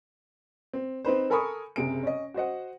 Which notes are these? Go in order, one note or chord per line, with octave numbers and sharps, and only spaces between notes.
C4
C4 D#4 B4 C5
A4 A#4 G#5 B5 C#6 D#6
F#1 C3 G#4 D7
C#4 D#5
F#4 C5 D#5 F#5